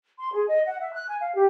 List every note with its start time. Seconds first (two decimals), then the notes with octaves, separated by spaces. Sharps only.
0.19 C6
0.32 G#4
0.48 D#5
0.66 F#5
0.80 E5
0.93 F#6
1.08 G#5
1.21 F5
1.34 G4